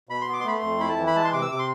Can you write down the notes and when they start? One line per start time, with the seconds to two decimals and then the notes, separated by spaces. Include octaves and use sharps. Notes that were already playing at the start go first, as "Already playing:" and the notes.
0.09 B2 B5
0.21 C6
0.28 B3
0.33 D6
0.40 C6
0.44 A3 B5
0.55 C6
0.63 F2
0.80 E4 B5
0.89 A5
0.98 E3
1.07 B5
1.16 G#3 A5
1.24 C6
1.33 C3 D6
1.42 E6
1.51 C3 D6
1.59 C6